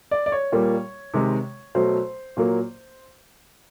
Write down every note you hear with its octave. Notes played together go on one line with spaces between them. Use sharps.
D5
D5
C#5
A#2 G3 A#3
C3 D#3 G#3
B2 F#3 A3 C5
A#2 F#3 A#3